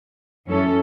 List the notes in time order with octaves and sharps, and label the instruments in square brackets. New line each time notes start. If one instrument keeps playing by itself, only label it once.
[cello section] F#2 E3 C#4 A4